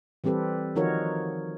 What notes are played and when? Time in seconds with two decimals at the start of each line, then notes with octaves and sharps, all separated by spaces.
0.24 E3 G3 C4 G4 A4 B4
0.76 D#3 F3 D#4 F#4 A#4 C#5